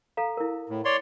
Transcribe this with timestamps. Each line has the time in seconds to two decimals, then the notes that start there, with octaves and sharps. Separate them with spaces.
0.17 A4 F5 A#5
0.37 E4 A#4
0.69 A2
0.85 C#5 D5 C6